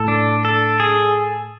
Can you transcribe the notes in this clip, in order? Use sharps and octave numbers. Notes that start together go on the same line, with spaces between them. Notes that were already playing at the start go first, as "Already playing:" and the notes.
Already playing: A2 A4
D4
A4
G#4